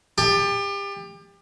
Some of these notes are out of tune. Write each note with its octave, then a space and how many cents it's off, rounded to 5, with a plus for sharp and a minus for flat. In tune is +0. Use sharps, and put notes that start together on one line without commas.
G4 +30 A5 +0